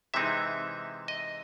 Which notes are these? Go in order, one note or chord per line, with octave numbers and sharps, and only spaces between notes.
C3 E3 G#3 C4 D#4 E5
D#5